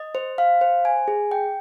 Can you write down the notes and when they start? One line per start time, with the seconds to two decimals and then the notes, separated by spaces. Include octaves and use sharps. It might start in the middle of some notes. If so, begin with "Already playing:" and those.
Already playing: D#5
0.15 C5
0.38 F5
0.61 C5
0.85 G#5
1.08 G#4
1.31 G5